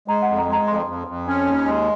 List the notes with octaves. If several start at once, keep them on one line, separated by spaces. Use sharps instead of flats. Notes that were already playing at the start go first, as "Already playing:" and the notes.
G#3 A#5
F#5
F2
A#5
G#3
A#5
F2 C6
F2
F2
C#4
D#2
G#3